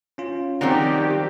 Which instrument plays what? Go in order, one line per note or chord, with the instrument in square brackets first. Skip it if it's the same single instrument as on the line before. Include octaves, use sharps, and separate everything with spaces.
[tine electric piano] C#4 F4
[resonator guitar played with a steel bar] D#3 G3 C4 [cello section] F3 G4 [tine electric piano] D5 F#5 A#5